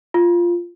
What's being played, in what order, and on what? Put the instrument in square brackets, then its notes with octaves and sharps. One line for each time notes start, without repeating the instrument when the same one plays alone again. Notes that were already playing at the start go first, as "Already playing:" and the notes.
[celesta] F4